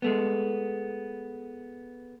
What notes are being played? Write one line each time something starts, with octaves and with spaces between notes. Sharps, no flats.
G#3 A3 B3